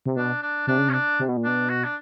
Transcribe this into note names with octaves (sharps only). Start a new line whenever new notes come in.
C3
B2 D4
D4
C3 D4
C#3
C3 C#4
D4
C3
B2
A#2
B2 D4
F#4
D4